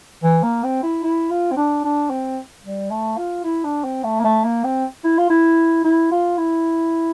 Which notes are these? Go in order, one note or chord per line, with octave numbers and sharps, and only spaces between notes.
E3
A#3
C4
E4
E4
F4
C4
D4
D4
C4
G3
A3
F4
E4
D4
C4
A3
A#3
A3
A#3
C4
E4
F4
E4
E4
F4
E4